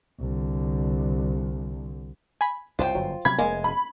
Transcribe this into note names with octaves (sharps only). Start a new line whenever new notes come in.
C2 D3
G#5 B5
C2 F#2 C#3 F4 C5 G5
G1 F#2 F#3
C3 F#3 G3 B5 G#6
F1 G#3 A#3
B5